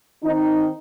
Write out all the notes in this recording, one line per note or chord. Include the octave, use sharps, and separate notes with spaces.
D#3 C4 D#4